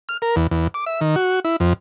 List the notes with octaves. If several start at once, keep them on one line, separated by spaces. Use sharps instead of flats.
F6
A#4
E2
E2
D6
E5
D#3
F#4
E4
F2